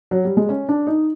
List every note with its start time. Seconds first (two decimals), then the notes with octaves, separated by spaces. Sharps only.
0.11 F#3
0.25 G3
0.37 G#3
0.49 C#4
0.69 D4
0.87 D#4